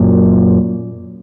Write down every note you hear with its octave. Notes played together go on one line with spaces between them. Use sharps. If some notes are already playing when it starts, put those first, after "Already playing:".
Already playing: F#2 A#2